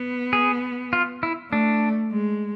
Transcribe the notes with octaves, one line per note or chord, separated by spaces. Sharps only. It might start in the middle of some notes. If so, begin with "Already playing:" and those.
Already playing: B3
G#4
F4
E4
A3 D4
G#3